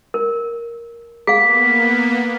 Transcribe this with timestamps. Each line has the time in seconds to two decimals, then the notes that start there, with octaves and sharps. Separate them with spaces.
0.14 A#4
1.27 A#3 B3 G#4 F5 B6